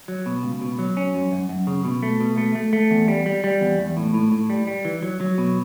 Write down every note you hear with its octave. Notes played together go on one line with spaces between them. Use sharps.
F#3
B2
C#2
B2
F#3
C#4
F#2
F#2
F#2
C#3
B2
A3
B2
A3
A3
A3
E2
G3
G3
G3
E2
E2
A2
A2
A2
G3
G3
E3
F#3
F#3
B2